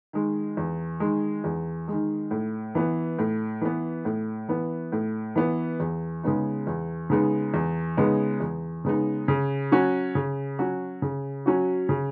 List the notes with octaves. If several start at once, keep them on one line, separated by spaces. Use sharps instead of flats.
D#3 G#3
E2
D#3 G#3
E2
D#3 G#3
A2
E3 B3
A2
E3 B3
A2
E3 B3
A2
E3 B3
E2
C#3 G#3 B3 D#4
E2
C#3 G#3 B3 D#4
E2
C#3 G#3 B3 D#4
E2
C#3 G#3 B3 D#4
C#3
F#3 C#4 F#4
C#3
F#3 C#4 F#4
C#3
F#3 C#4 F#4
C#3